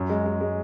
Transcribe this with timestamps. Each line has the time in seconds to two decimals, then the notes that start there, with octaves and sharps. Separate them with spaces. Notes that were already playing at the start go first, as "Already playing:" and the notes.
Already playing: F#2
0.10 G#3
0.26 G#3
0.41 G#3